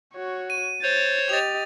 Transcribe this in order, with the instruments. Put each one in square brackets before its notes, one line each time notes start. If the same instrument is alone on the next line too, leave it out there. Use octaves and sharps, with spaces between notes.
[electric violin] F#4 C#5
[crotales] D#7
[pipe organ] C5 C#5 [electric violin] A6
[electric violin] G4 D#5 [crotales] A6 F7